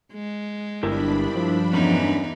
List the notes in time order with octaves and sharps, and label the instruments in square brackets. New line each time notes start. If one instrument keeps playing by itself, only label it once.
[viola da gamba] G#3
[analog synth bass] G1 [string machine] G2 D4 B5 [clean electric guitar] E4 G4 A#4
[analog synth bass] F3
[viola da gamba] E2 D#4 [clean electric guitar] F#3 C#4